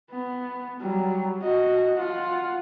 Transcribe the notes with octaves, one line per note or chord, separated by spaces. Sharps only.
B3
F#3 G3
F#4 D#5
F4 F#5